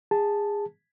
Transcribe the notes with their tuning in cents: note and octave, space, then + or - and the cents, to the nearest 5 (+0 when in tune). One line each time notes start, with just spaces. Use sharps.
G#4 -20 A5 +0